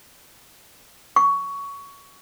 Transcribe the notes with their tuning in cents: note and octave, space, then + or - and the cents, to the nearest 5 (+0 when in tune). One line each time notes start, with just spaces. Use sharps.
C#6 +15